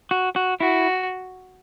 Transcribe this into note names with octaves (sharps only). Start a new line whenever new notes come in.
F#4
F#4
E4 F#4